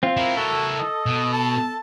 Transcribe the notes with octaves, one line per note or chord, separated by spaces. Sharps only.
C4 F4
E4 A#4
F#4 A4
D#5
B2
A5